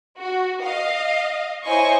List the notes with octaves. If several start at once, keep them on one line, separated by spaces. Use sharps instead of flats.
F#4
D#5 F5
E4 C5 C#5 D#5 G#5 C#6